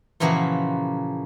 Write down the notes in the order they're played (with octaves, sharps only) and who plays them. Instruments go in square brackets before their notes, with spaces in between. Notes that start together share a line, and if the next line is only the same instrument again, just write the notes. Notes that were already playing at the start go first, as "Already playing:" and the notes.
[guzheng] A#2 C#3 E3 F3 A#3 F#4